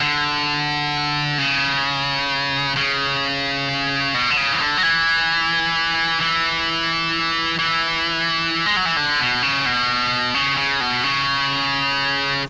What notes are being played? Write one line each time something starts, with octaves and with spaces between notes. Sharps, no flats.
D3
C#3
C#3
B2
D3
C#3
E3
D3
F#3
E3
E3
E3
G#3
F#3
E3
D3
B2
C#3
B2
C#3
C#3
B2
C#3